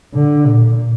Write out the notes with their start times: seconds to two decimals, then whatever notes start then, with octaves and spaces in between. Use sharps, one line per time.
0.14 D3
0.46 A#2